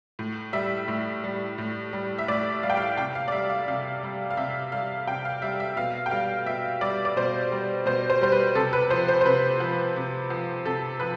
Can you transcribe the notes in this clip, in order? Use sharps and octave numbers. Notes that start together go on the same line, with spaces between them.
A2
G3 E5
A2
G3
A2
G3
E5
A2 D5
G3 F5
G5
F5
C3 G5
F5
D5
G3 E5
F5
C3 F5
G3
F5
C3 E5
G3 F5
C3 G5
F5
G3 E5
E5
B2 F5
G5
G3 F5
B2 E5
G3 D5
D5
B2 C5
G3
B2 C5
C5
G3 C5
B4
C3 A4
B4
F3 C5
C5
C5
C3 B4
F3
C3
F3
C3 A4
F3 B4